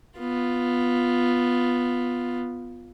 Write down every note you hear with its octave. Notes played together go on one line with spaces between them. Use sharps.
B3 F4